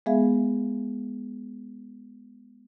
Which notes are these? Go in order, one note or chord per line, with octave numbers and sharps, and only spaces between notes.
G#3 B3 G#4 E5 F5